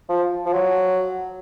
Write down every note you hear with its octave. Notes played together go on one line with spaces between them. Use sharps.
F3
F3
F#3